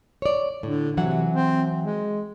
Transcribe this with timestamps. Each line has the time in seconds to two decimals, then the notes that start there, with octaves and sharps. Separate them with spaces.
0.22 C#5 D5
0.63 A2 D3
0.97 C3 E3 F#3 F#5
1.29 C4
1.83 G#3